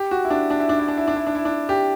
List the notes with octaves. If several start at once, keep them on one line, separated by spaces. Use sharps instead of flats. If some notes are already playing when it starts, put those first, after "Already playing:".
Already playing: G4
F#4
E4
D4
D4
E4
D4
E4
D4
E4
D4
E4
D4
E4
D4
G4